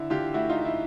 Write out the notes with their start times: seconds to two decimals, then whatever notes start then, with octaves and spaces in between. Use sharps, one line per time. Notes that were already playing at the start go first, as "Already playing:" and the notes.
Already playing: D3 E4
0.10 D3 F4 G4
0.34 A3 E4 F#4
0.49 D#4 F4
0.57 A3
0.65 E4